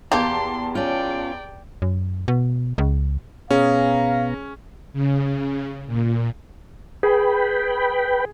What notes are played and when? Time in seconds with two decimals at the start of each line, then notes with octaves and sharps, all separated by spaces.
0.12 E2 A#3 G4 A5 C6
0.75 C#4 F4 D5 G5
1.82 F#2
2.28 B2
2.78 C#2
3.51 B2 B3 C#4 G#4 F5 A#5
4.93 C#3
5.87 A#2
7.03 G#4 B4 G5 B5